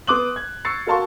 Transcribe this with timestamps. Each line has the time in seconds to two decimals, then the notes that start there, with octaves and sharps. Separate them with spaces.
0.07 B3 C6 D6 D#6 F#6 F#7
0.36 G#6
0.65 C#6 E6 A6 C7 C#7
0.86 F#4 A#4 F5 A5 C6 C#6